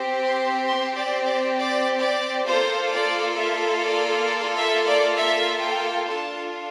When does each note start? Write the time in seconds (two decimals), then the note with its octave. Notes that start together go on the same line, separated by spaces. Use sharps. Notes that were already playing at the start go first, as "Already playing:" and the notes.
Already playing: C4 G4
0.21 C6
0.66 C6
0.96 D5
1.26 D5
1.56 D5
2.02 D5
2.46 A#3 F4 A4 C5
2.91 D5
3.36 E5
3.82 D5
4.26 D5
4.57 E5
4.86 D5
5.17 E5
5.61 G5
6.06 D4 F4 A4 A5